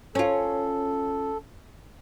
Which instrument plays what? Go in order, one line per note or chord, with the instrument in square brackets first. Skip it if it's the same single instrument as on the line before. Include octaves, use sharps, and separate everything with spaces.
[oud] C#4 F4 [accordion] A4